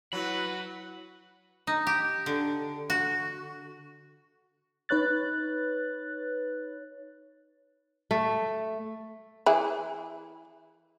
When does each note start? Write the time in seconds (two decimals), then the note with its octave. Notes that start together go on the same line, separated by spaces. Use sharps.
0.13 F#3 E4 F#4 B4 B5
1.67 D#4
1.87 G4
2.26 D3
2.90 F#4
4.89 D#4 B4 C#5 F#6 A6
8.11 A3
9.46 E3 E4 G#4